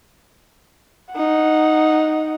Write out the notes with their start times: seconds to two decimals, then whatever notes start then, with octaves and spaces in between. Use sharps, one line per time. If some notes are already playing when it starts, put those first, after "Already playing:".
1.13 D#4 F#5